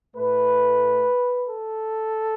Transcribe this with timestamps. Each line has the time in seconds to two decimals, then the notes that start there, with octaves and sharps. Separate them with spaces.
0.16 A2 A3 B4
1.49 A4